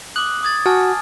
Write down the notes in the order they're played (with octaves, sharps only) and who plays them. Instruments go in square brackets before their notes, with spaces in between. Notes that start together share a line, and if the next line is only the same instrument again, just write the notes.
[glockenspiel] D6 D#6 [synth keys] F#6
[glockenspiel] D#6 G#6 A6
[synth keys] F#4 [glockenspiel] G#5 A5 F6